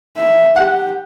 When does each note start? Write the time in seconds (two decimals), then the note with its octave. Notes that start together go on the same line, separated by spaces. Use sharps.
0.17 E5
0.56 G4 F#5